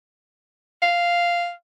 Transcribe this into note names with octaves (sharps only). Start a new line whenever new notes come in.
F5